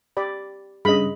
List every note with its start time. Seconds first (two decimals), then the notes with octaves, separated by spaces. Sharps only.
0.17 G4 D5 B5
0.85 G2 C#3 G#4 D#5 B5